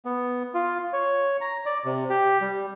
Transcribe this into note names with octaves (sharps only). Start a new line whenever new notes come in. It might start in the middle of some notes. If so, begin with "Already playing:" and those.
B3
F4
C#5
A#5
D5
C3
G4
G3